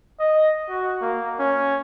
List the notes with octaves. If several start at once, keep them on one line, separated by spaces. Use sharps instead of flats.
D#5
F#4
A#3
C#4